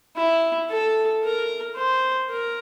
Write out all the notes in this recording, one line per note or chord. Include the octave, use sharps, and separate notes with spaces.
E4
A4
A#4
C5
A#4